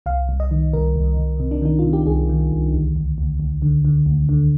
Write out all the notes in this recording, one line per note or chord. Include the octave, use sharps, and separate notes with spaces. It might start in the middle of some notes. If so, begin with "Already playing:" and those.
C2 F5
C2
D#5
D#3
C2 A#4
C2
C2
C3
D4
D#3 D#4
F4
C3
G4
C2 G#4
D#3
C2
D2
D2
D2
D2
D3
D3
D2
D3